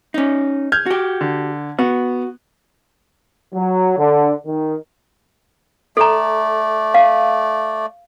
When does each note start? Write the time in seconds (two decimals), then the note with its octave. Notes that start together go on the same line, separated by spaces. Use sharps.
0.14 C#4 D#4
0.72 F6 G6 G#6
0.86 F#4 G4
1.21 D3
1.79 B3 F#4
3.53 F#3
3.97 D3
4.45 D#3
5.97 A3 A4 D5 A#5
6.94 F5